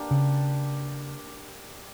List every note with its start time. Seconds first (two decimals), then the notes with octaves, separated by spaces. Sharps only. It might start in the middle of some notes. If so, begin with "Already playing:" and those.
Already playing: A#3 D4 G4 B4
0.11 C#3